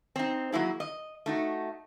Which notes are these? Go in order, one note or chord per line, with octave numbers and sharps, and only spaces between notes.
C4 D#4
F#3 A#3 E4 G#4
D#5
A3 D#4 F#4